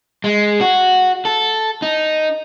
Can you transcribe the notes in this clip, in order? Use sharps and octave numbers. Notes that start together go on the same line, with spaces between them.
G#3
F#4
A4
D#4